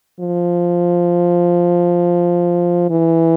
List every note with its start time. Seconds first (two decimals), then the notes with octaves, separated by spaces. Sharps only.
0.20 F3
2.90 E3